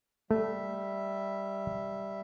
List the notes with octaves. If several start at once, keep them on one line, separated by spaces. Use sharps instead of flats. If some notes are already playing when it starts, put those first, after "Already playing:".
G3 A3 E5